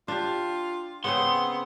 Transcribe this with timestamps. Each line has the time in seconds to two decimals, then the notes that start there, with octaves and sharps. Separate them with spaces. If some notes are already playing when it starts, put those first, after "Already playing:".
0.08 D4 F4 G4
1.04 C#3 B3 C4 G#4 C6